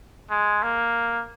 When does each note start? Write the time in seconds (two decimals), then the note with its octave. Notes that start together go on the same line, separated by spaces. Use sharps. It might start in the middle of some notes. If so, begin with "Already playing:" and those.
0.30 G#3
0.63 A#3